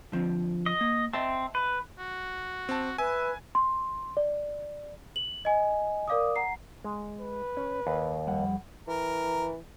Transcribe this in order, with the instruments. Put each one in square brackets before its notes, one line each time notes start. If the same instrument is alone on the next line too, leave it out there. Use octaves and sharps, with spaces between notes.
[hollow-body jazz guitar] D3 F3 C4
[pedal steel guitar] D#5
[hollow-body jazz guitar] A#3
[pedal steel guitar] C4 [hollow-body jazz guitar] D#5 E5 A5
[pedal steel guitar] B4
[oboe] F#4
[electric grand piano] C4 A5
[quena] B4 [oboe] E5 [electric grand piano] G#5
[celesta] C6
D5
F#7
D#5 G#5
A#4 D5 F5 D6 D#6
F#5 A#5 C7
[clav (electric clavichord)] G#3
[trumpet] B4
[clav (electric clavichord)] C#4
D#2
[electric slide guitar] F2 G3 F#5
[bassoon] E3 [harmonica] A#4